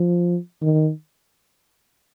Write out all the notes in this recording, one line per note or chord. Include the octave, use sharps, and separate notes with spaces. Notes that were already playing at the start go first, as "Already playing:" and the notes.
Already playing: F3
D#3